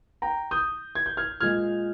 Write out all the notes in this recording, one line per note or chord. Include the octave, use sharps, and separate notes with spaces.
G5 A#5
D#6 G6
G#6
G6
F6 G#6
A#2 G#3 F6 G#6